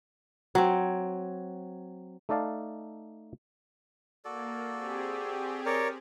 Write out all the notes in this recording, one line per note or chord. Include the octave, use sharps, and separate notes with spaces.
F#3 C4
A3 D#4 A4 D5 F5 A5
A#3 F#4 A4 D5
C4 G4 G#4
A#4 C#5 D5